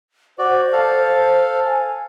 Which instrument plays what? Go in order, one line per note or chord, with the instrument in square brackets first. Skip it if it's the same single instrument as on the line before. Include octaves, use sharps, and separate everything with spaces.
[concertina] F#4 D5 [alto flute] C5
[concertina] A4 F5
[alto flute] G#5